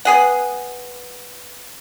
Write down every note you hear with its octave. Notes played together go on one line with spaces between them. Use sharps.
B3 G#4 F#5